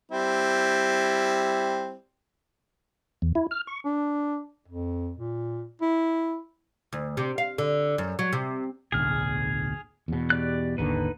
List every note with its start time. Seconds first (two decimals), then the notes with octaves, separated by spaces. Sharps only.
0.11 G3 C4 E4
3.22 E2
3.35 E4
3.51 F6
3.67 C#6
3.85 D4
4.68 F2
5.18 A#2
5.81 E4
6.93 D2
7.17 C3
7.38 F5
7.58 D3
7.98 F#2
8.19 F#3
8.33 C3
8.92 D1 B1 G#4 F6
10.08 E2 B2
10.30 G4 D5 F#6
10.78 G#1 D#2 D3 D#4 B4